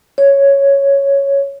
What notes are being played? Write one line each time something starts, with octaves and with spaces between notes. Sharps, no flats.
C#5